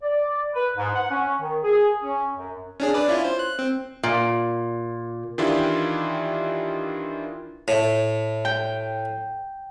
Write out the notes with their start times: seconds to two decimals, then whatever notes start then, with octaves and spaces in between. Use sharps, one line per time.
0.02 D5
0.54 B4
0.76 G#2
0.95 F#5
1.10 C#4
1.40 D#3
1.64 G#4
2.02 C#4
2.36 F#2
2.80 C#4 D4 G#4
2.94 D4 B4 D5
3.08 C#4 E4 F4
3.24 C5
3.39 F#6
3.59 C4
4.03 A#2
5.38 D#3 E3 D4 E4 F4 G4
7.68 A2
8.45 G5